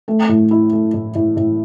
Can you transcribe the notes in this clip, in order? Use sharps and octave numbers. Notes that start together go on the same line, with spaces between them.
A3
A2
E4
A3
A2
A2
A2